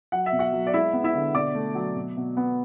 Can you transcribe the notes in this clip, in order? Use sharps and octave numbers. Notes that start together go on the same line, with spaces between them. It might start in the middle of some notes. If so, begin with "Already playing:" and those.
F#3 F#5
E5
B2
F#4 F#5
F#3
D5
G#3 E4 E5
B3
E4 E5
D3
B2 D5 D6
A3
F#3
B2
B2
B3